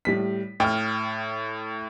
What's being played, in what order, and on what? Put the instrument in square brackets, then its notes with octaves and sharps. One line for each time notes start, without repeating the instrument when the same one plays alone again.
[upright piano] A2 G3 B6
[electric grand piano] A2 [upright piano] G5 F6